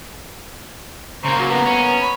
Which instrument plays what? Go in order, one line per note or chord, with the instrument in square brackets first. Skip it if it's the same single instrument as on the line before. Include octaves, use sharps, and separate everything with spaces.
[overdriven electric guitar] C#3 A#3 [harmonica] C5 A#5 C#6
[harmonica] F#3
B3 A#5
[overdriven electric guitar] C#4
[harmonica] B5